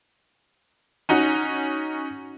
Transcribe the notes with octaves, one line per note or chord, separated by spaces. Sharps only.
C#4 D#4 F#4